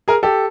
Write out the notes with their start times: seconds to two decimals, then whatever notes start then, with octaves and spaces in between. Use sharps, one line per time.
0.08 G#4 A#4
0.23 G4 A4